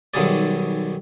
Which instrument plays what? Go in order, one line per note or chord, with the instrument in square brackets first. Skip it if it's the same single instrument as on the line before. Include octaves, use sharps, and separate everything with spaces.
[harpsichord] B1 D#3 F#3 G3 G#4 D5